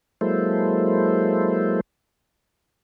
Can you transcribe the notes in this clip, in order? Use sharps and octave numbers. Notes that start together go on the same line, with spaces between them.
F#3 G#3 A#3 E4 A4 C5